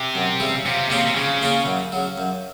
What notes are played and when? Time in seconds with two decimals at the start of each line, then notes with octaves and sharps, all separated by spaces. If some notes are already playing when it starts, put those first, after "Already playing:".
Already playing: C3
0.15 F#2
0.40 C#3 E3 G3
0.66 C3 F3
0.90 C3 A#3 C#4 F4 G#4
1.06 C3
1.15 C#3 F3
1.42 A#3 C#4 F4 G#4
1.66 F#2
1.92 C#3 F#3
2.18 F#2